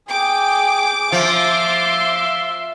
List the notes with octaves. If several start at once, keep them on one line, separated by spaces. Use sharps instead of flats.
G#4 G5 D6
F3 E5 C6